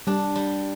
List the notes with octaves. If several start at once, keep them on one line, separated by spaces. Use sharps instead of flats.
G3 D4
G3